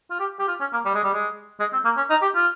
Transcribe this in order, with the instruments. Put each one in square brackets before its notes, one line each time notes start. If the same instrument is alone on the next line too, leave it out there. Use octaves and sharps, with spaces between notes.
[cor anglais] F4
G4
G4
F4
C#4
A#3
G3
G#3
G3
G#3
G#3
C4
A#3
C#4
D#4
G4
F4